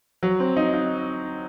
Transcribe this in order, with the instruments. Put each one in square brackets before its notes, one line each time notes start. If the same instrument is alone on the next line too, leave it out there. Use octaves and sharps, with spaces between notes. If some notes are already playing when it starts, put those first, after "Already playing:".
[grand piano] F#3
C4
D#4
D#4